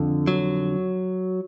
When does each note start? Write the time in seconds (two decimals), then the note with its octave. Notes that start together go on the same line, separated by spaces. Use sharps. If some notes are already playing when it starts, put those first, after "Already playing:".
Already playing: F2 D3
0.27 F#3